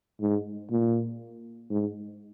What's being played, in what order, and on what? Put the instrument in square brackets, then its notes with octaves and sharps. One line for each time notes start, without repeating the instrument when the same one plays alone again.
[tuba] G#2
A#2
G#2